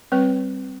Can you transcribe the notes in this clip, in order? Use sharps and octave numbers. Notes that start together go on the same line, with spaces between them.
G3 C4 B4